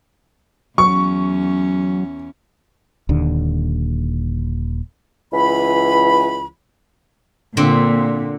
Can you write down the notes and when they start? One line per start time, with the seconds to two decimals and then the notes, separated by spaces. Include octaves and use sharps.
0.78 E2 F#3 C#4 C#6
3.09 D#1 D#2 D3
5.32 C#2 E3 B5
7.57 A#2 D3 C4